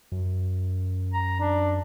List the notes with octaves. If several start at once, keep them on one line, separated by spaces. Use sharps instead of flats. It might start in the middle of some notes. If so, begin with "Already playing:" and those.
F#2
A#5
D4